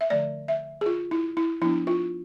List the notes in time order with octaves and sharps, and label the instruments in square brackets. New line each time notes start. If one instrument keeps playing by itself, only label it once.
[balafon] E5
D3 F3 A3 D5
E5
G#4
F4
E4
E4
F3 B3 D4 E4
F4